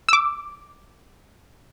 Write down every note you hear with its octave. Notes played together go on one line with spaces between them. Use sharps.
E6
D6